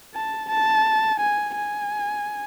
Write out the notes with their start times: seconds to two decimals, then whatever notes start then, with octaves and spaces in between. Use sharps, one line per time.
0.14 A5
0.49 A5
1.19 G#5
1.55 G#5